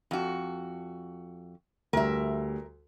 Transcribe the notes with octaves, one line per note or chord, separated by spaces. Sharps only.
F2 F#4
D2 G3 A#4 E5